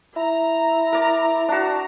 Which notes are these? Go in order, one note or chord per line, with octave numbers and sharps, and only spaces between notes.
E4 A#5
A#4 D5
D4 F#4